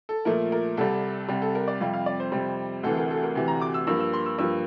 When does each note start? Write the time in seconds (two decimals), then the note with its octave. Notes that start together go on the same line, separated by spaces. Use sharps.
0.09 A4
0.25 A#2 F3 A3 A#4
0.52 A#4
0.77 C2 C3 G3 A4
1.28 C2 C3 G3
1.42 A4
1.55 A#4
1.68 D5
1.81 F2 C3 G3 F5
1.93 F5
2.06 D5
2.20 C5
2.32 F2 C3 G3
2.83 D2 C3 E3 A4
2.97 A#4
3.10 A4
3.23 A#4
3.35 D2 C3 E3
3.48 A#5
3.61 D6
3.74 E6
3.87 G2 F3 A#3 E6
4.00 E6
4.13 C6
4.26 E6
4.38 G2 F3 A#3 E6